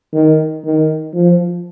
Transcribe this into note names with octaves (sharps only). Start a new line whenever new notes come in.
D#3
D#3
F3